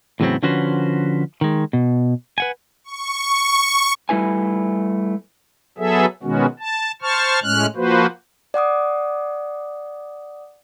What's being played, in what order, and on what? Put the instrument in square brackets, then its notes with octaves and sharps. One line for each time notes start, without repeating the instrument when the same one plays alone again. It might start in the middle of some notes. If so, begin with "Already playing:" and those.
[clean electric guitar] E2 A2 C#3 F#3 B3 C4
D3 F3 C#4 F#4 B4 C5
D#3 G#3
B2
B4 F#5 G#5
[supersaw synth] C#6
[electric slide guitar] G3 A3 E4 B4 G#5
[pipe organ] F#3 B3 G#4 A4 E5
B2 D#3 G#3 B3 C#4 F#4
A5
C5 A5 C#6 F6
A2 G#3 C#4 F6 F#6
F3 A#3 F#4 B4 C5
[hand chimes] D5 F#5 D6 D#6